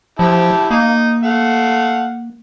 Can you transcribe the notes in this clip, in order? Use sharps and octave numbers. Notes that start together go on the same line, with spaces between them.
F3 E4 G4 A5
A#3 D#4
A3 F5 F#5